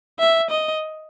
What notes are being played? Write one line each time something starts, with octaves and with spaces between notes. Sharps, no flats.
E5
D#5